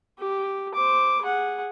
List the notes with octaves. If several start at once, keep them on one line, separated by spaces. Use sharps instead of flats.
G4
C5 D6
G#4 F#5